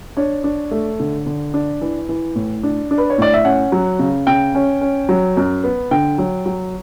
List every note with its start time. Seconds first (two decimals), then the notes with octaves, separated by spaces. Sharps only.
0.17 D4 C#5
0.44 D4
0.71 A3
1.00 D3
1.26 D3
1.54 D4
1.81 E3
2.09 E3
2.36 A2
2.63 D4
2.91 D4
2.98 B4
3.10 C#5
3.18 A2 D5
3.34 E5
3.45 C#4 F#5
3.72 F#3
3.99 C#3
4.27 C#3 G5
4.55 C#4
4.81 C#4
5.09 F#3
5.37 F#2
5.64 B3
5.91 D3 G5
6.18 F#3
6.46 F#3